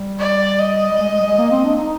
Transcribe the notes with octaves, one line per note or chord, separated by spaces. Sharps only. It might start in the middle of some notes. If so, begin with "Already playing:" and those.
Already playing: G3
D5
D#5
G3
G#3
G#3
G3
G#3
A#3
C4
D4
D#4